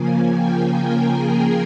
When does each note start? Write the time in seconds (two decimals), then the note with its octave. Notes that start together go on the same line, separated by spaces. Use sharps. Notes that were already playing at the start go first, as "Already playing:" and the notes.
Already playing: C#3 F3 A#3 G#5
0.32 G5
0.73 A#4
1.15 G#4